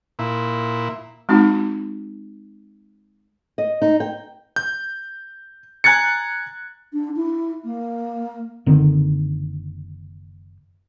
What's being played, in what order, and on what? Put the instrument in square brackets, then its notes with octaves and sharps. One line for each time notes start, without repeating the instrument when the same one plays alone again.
[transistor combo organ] A#2 E4
[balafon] G#3 C4 D#4 F#4
[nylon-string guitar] D#5
D#4
G5
[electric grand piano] G6
G#5 A#5 F#6 G#6 A6 C#7
[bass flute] D4
E4
A#3
[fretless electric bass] F#1 D3 D#3 C4